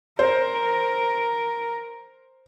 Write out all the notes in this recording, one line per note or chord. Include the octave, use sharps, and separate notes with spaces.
A#4 C5